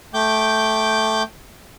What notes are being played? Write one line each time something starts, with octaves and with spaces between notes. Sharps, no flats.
A3 G5 D6 G6